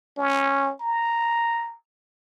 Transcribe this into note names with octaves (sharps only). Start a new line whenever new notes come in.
C#4
A#5